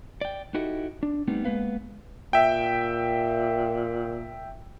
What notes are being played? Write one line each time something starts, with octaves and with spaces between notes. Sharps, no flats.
D5 G5
D#4 E4 F#4 G4 A4 D#5
D4
G3 A3 B3 C4 D#4
G#3 A#3 B3 B4 F5
A#2 E5 G5